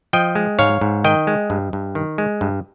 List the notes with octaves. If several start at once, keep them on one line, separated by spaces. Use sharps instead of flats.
F3 D#5 G5
G#3
G#2 C#5 F5
G#2
D#3 D#5 G5
G#3
G2
G2
D#3
G#3
G2